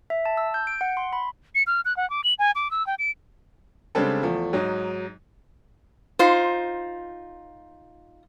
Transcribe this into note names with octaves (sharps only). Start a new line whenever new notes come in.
E5
A5
E6
G6
D7
F#5
C6
B5
C#7
F6
F#6
F#5
D6
F#7
G#5
D6
E6
G5
D7
C#3 G3 G#3 C4 D4 A4
E2 F3 A3
G#2 F#3 D#4
D#4 F4 C5